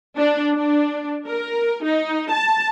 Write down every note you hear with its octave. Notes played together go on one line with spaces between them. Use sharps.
D4
D4
A#4
D#4
A5